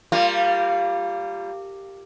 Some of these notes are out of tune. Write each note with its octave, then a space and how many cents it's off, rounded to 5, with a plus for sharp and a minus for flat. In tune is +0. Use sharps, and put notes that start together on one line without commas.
G3 +0 A#3 -30 F4 -5